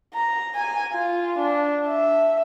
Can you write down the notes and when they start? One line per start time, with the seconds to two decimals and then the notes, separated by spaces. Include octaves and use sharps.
0.14 A#5
0.55 G#5
0.93 F4
1.39 D4
1.88 E5